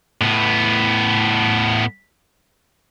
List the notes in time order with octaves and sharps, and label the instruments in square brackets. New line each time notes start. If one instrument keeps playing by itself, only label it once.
[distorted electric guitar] A2 B3